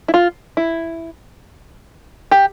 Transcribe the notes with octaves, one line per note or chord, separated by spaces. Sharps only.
E4
F4
E4
G4